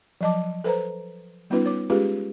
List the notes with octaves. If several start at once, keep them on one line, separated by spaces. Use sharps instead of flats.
F3 F#3 D#5 A5 D6
A4 B4 C5 A#5
G3 B3 C#4 D#4 F4 B4
C#5 D6
G#3 C#4 F4 G4 G#4 B4